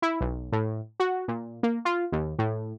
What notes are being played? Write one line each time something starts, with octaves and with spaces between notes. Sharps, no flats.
E4
B1
A2
F#4
A#2
A#3
F4
D#2
A2